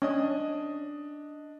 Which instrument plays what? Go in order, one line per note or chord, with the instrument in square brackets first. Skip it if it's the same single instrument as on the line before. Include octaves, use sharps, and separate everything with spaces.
[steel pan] C#4 [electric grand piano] D4 D#5 D#6